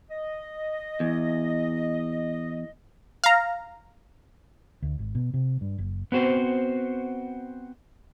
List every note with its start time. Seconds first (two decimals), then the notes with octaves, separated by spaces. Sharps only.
0.10 D#5
1.00 E2
3.24 F5 A#5
4.82 D2
4.99 G#1
5.15 B2
5.34 C3
5.61 G2
5.78 F#1
6.12 B3 C4 F#4 C5